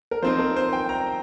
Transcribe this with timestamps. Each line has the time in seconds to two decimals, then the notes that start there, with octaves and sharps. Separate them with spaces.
0.11 A#4
0.22 F3 C4 D#4 C5
0.39 A#4
0.56 C5
0.73 G5
0.89 A#5